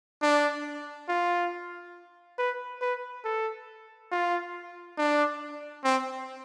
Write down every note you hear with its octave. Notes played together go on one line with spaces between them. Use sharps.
D4
F4
B4
B4
A4
F4
D4
C4